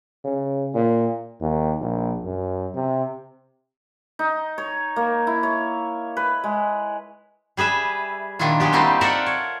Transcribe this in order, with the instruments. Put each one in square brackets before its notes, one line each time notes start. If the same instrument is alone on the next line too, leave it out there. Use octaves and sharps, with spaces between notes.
[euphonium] C#3
A#2
[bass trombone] D#2
A#1
F#2
C3
[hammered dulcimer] D#4
C#5
A#3
E4
C#5
B4
G#3
[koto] G3 G#4 B4 E5
A#2 D#3 D4 E4 F4
F#3 G#3 B3 G4
G3 A3 A#3 C4 D#4 E4
F4 A4 A#4 D5 E5 F#5
C#5